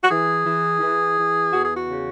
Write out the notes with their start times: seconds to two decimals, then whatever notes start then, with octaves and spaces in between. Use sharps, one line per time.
0.03 F#4
0.09 E3 G#4
0.45 E3
0.80 E3
1.16 E3
1.52 E2 F#4
1.64 G#4
1.76 F#4
1.88 C#3